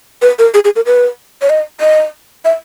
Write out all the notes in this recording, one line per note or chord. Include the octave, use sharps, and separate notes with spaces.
B4
A#4
G#4
G#4
A#4
B4
C#5
D#5
D#5
E5